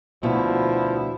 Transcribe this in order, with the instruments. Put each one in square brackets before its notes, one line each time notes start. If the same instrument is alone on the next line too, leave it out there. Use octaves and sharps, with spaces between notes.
[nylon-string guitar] D2 B2 [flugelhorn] F3 [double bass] E4